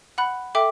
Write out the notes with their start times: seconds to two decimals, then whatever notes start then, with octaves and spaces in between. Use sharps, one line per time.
0.18 F#5 B5 F#6
0.55 A4 E5 G5 D6